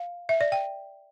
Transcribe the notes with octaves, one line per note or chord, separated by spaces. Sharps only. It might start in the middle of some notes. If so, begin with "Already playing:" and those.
Already playing: F5
E5
D5
G5